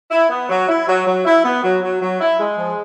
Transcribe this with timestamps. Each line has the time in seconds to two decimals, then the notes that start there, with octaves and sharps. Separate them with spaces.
0.10 E4
0.29 B3
0.49 F#3
0.67 E4
0.87 F#3
1.05 F#3
1.24 E4
1.43 B3
1.62 F#3
1.81 F#3
2.01 F#3
2.19 E4
2.39 G#3
2.57 F3